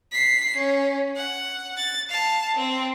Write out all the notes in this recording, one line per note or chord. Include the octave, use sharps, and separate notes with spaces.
B6 C7
C#4
F#5
A6
F5 A5
C4